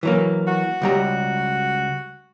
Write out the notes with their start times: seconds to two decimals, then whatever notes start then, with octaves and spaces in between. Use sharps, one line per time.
0.03 E3 F#3 A#3
0.47 F#4
0.82 C#2 G3 A#5